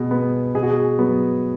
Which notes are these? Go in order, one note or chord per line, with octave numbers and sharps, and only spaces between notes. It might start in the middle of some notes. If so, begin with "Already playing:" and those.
Already playing: B2 G#4
B3
B2 G#4
F#4
G#4
F#3 B3